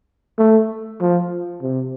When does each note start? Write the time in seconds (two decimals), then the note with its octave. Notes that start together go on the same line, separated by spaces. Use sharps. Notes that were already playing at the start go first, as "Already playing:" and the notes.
0.38 A3
1.00 F3
1.62 C3